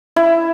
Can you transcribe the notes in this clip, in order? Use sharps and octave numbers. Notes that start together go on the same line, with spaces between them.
E4